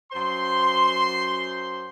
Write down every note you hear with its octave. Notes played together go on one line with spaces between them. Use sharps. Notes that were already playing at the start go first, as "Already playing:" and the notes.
F#2 C5 C6